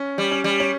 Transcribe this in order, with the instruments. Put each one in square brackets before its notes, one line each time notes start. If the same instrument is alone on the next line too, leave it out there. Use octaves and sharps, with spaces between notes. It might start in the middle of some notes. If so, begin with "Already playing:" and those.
Already playing: [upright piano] C#4
[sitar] G3
[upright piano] C#4
[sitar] G3
[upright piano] C#4